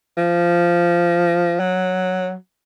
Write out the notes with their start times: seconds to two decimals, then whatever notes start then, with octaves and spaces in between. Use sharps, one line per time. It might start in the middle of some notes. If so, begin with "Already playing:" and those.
0.17 F3
1.60 F#3